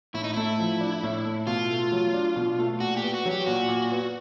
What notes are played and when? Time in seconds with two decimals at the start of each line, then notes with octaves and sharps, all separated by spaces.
0.14 A2 E4
0.24 D#4
0.34 A3 E4
0.59 F3
0.81 D4
1.03 A2
1.25 A3
1.47 B2 F4
1.70 A3
1.92 F#3
2.14 D4
2.36 B2
2.59 A3
2.80 A#2 F#4
2.97 G4
3.03 B3
3.14 F#4
3.25 F#3
3.31 G4
3.46 A#2 F#4
3.68 A#2
3.92 B3